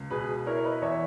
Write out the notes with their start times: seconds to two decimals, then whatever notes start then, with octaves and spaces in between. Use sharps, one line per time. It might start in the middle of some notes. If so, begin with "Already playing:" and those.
Already playing: C#2
0.11 B2 G#4 B4
0.46 E4 A#4 C#5
0.64 B4 D#5
0.82 E2 C#5 E5